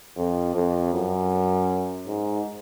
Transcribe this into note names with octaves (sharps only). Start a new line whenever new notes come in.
F2
F2
F#2
G#2